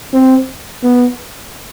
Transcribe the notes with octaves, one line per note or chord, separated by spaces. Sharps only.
C4
B3